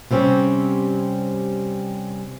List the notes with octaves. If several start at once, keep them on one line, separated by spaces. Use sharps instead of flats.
C3 G3 C4 C#4